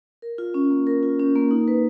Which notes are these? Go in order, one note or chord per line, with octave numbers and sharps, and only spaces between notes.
A#4
F4
C#4
A#3
A#4
F4
C#4
A#3
D#4
B4